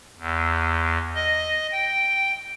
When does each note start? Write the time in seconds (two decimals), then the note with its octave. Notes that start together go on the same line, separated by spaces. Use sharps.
0.18 E2
1.15 D#5
1.72 G5